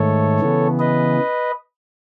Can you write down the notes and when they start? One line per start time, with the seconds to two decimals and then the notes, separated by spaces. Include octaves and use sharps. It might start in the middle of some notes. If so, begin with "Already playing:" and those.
Already playing: G#2 D#3 A3 A4 C#5
0.40 C#3 E3 B3
0.79 B4 D#5